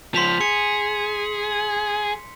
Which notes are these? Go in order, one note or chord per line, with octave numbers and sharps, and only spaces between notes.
C#2 F3 C6 B6 F7
G#4 C#7